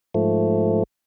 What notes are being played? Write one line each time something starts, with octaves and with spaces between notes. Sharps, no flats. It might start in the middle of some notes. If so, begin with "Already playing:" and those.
G#2 F3 A3